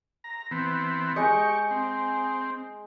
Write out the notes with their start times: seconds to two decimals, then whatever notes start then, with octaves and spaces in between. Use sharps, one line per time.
0.24 A#5
0.51 E3 B3 C4
1.16 G#3 G4 D#5 C#6
1.71 C4